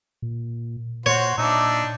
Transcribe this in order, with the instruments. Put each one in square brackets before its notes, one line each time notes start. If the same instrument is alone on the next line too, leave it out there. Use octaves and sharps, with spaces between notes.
[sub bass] A#2
[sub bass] A#2 [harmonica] F#4 C5 [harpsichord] C#5
[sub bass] A#2 [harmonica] D4 D#4 E5